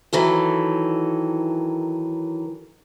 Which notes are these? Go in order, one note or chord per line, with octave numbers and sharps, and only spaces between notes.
D#3 E3 F#3 A4